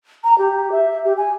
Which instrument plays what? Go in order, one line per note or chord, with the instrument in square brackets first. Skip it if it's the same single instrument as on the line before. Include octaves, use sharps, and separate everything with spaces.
[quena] A#5
G4
E5
G4
G#5